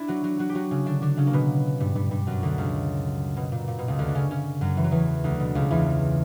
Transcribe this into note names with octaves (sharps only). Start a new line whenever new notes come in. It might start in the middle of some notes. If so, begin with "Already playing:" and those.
Already playing: D4 E4
F#3 F#4
F#3 F#4
F#3 F#4
G4
F#3 F#4
C#3 C#4
D3 D4
D3 D4
C#3 C#4
A#3
B2 B3
G2 G3
G2 G3
G2 G3
F#2 F#3
D2 D3
C#2 C#3
B2
A#2
A#2
B2
C#2 C#3
D2 D3
D4
C#3 C#4
C#3 C#4
F#2 F#3
E3
F#3
E2 E3
D2 D3
B2
C#2 C#3
E2 E3